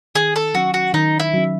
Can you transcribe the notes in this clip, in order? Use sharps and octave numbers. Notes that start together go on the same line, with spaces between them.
D#3 G#4
A4
F#3 C#4 F#4
F#4
D#3 D#4
E4
F#3 C#4